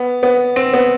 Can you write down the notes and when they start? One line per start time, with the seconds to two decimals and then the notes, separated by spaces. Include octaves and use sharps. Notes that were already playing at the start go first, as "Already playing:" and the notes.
Already playing: B3
0.23 B3
0.56 C4
0.73 B3